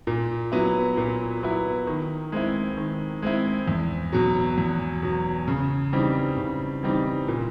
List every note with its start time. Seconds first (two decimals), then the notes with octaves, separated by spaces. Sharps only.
0.07 A#2
0.52 F#3 B3 E4
0.97 A#2
1.42 F#3 B3 E4
1.87 D#3
2.32 G#3 C4 E4
2.77 D#3
3.22 G#3 C4 E4
3.68 E2
4.13 B2 F#3
4.58 E2
5.03 B2 F#3
5.48 C#3
5.93 E3 G3 C4 D#4
6.38 C#3
6.83 E3 G3 C4 D#4
7.28 A#2